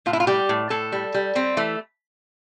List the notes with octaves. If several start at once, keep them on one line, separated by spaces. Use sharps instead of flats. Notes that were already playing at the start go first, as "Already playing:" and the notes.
A2 F4
E4
F4
G3 G4
A2
A2 A4
G3
G3
G3 C4
E3 A3